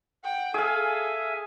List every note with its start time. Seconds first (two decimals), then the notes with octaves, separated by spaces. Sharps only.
0.24 F#5 G5
0.54 G#4 A4 E5 F5 G#5